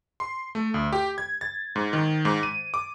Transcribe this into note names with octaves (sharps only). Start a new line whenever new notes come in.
C6
A3
D2
G4
G#6
A6
G#2
D#3
G#2
D#7
D6